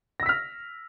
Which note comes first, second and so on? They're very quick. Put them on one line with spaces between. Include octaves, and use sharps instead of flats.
A#6 E6 B6 F6